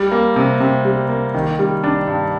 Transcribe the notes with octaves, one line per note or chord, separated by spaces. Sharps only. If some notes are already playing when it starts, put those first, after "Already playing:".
Already playing: G3
A#3
C3
C3
G3
A#3
D#3
G3
D4
G2